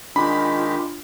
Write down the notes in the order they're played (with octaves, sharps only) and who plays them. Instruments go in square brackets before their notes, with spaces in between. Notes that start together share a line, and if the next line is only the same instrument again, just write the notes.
[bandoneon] D#3 G#3 G4 [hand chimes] D4 [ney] F4 [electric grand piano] B5